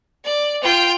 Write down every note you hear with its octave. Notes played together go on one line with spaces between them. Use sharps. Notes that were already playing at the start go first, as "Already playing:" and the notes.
D5
F4 G5